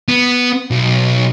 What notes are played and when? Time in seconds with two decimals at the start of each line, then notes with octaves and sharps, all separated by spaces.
0.09 B3
0.70 B1